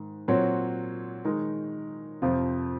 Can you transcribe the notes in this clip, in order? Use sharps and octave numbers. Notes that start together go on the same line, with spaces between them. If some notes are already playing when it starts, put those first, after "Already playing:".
Already playing: G#2 D#3
A#2 F#3 C4 F#4 C#5
D#3 G#3 D#4 A#4
F2 C3 F3 C4 F4